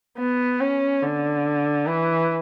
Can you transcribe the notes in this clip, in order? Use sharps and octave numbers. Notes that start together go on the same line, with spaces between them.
B3
C#4
D3
E3